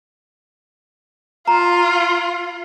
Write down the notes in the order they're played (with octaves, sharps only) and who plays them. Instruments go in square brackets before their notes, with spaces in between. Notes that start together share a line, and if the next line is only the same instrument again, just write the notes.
[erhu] F4 [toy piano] A#5